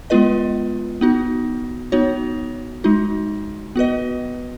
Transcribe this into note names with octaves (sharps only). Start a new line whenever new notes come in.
G#3 B3 F4 B4 D#5
B3 D#4 F#4
B3 D#4 F#4 C#5
G#3 D#4 F#4
B3 F#4 B4 D#5